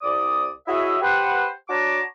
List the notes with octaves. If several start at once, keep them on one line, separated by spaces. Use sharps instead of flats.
C2 D5 D#6
E4 F#4 G#4 C#5 D#5 E5
G4 B4 C5 F#5
D4 F#4 C#5 A5 A#5 D6